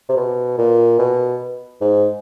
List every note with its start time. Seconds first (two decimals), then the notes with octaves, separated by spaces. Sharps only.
0.09 C3
0.17 B2
0.58 A#2
0.99 B2
1.81 G#2